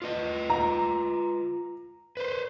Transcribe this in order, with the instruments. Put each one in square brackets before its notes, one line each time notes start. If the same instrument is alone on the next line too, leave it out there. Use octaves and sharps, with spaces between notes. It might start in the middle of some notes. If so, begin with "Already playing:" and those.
[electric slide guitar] F4 B4 D#5
[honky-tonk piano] A#5
[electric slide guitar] B4 C5